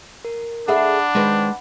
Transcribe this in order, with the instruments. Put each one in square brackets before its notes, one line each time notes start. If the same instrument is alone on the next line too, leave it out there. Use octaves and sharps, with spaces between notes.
[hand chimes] A#4
[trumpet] D4 [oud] G#4 A4 E5 [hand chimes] F#5 B5
[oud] D#3 C4 B4 [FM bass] G#3